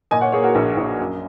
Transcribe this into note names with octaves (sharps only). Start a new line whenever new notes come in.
A#2 D#5 G#5
C#5 F#5
A#3 G#4 C#5
F#4 A#4
A#1
A#1
F#2